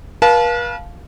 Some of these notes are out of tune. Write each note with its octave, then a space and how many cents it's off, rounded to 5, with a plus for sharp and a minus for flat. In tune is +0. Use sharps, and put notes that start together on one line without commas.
B4 -45 F5 +0 A5 -25